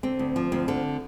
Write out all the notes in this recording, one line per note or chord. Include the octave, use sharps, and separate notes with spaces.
D3 C4
D2
F3
D2 C4
D3